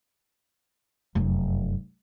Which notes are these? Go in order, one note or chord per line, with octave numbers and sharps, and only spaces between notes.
F1 F#2